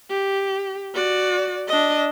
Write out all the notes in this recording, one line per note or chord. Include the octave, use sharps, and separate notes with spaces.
G4
F#4 D5
D4 D#5